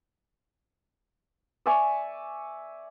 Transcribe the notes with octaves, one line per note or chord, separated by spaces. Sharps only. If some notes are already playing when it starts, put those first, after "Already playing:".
D5 E5 G#5 C#6